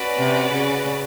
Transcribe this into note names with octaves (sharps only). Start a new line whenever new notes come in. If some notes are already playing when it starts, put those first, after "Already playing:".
Already playing: C#4 F#4 B4 D5
C3
C#3